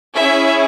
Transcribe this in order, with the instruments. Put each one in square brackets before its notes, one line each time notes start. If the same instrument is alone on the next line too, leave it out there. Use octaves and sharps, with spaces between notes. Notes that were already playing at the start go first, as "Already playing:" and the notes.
[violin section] C#4 E4 G#4 E5